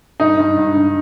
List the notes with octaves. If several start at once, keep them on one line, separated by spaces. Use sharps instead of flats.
G2 D#4
G2
G2
G2